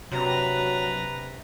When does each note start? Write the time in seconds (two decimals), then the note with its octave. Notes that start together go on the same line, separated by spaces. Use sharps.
0.12 C3 F#3 D4 B4 A#5